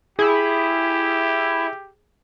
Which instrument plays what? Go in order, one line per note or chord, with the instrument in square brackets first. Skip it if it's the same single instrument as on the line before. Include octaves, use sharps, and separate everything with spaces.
[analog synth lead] E4 [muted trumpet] G4 [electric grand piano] G#4